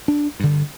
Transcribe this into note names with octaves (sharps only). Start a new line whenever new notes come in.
D4
G2 D3